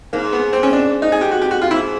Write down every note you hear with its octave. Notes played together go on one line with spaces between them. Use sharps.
G#2 A#3
B3
C4
C#4
D4
D#4
G#4
G4
F#4
G4
F#4
F4
G#2 E4